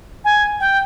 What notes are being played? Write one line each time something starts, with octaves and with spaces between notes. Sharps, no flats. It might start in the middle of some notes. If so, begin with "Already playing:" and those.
G#5
G5